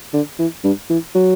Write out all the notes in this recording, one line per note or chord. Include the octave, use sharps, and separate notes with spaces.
D3
E3
G2
E3
F#3